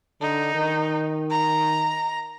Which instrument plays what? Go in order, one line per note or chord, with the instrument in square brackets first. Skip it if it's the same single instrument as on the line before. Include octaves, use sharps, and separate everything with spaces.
[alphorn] D3 [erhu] D#4
[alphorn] D#3
[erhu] A#5